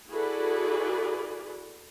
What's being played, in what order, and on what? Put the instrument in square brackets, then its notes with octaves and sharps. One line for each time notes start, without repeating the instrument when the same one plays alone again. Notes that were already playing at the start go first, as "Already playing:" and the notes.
[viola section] E4 F#4 G#4 A4 B4 D5